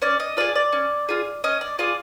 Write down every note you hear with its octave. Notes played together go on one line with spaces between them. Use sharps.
C#4 D5
D#5
F4 G#4 D5
D5
C#4
F4 G#4
C#4 D#5
D5
F4 G#4 D5